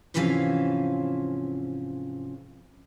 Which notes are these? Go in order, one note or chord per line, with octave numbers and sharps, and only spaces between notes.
G#2 C3 E3 F3 C#4 F5